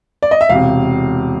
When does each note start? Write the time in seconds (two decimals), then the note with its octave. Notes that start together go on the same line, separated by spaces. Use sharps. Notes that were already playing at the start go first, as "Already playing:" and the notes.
0.22 D5
0.31 D#5
0.41 E5
0.49 E1 C3 F5